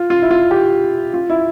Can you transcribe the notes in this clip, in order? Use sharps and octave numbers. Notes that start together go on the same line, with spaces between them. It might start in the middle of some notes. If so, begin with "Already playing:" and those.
Already playing: F4
F4
E4
F4
G4
F4
E4